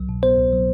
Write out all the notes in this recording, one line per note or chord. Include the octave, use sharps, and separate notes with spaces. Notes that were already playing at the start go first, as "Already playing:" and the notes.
Already playing: C2 F#3
B2
B3 C5
C2
F#3